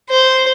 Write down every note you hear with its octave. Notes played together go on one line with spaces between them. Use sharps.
C5